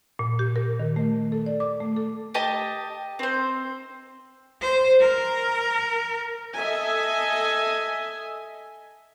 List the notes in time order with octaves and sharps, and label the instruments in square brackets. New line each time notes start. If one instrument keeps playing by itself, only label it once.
[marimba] A#2
G4
A#4
D#3
A3
A4
D5
D6
A3
A4
[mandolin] G4 D#5 A5
C4 C5
[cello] C5
A#4
[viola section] A4 D#5 E5 G#5